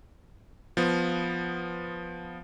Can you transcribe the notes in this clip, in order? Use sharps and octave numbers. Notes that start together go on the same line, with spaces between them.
F3 B3